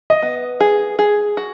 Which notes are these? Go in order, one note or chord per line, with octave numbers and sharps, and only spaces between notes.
D#5
B3
G#4
G#4
F#4